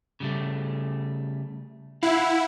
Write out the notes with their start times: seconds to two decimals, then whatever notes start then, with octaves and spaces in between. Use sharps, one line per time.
0.20 C#3 G3 A3
2.03 E4 F5 F#5